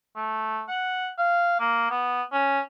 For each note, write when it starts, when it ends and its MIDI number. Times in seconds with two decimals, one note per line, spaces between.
0.16 0.62 57
0.69 1.08 78
1.18 1.58 77
1.60 1.89 58
1.90 2.23 59
2.33 2.60 61